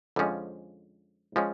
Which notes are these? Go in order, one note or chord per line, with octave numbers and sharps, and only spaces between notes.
F2 D3 F3 G#3 C#4
F3 G#3 C#4